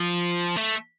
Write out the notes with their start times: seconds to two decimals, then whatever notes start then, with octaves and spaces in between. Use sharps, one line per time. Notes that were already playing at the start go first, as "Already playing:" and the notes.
Already playing: F3
0.56 A3